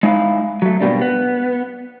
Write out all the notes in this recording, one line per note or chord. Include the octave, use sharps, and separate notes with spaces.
G#3 D#4 E4 F5
F#3 A3
G#2 B2 G3 A#3 D4
B3